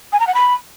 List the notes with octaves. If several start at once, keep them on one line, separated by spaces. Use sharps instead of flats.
G#5
A#5
F#5
B5